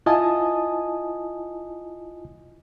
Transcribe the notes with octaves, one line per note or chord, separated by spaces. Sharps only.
E4 F4 D#5 G#5 A5 D#6